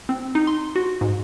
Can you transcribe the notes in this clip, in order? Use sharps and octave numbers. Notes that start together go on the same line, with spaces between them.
C4
D#4
C6
F#4
G#2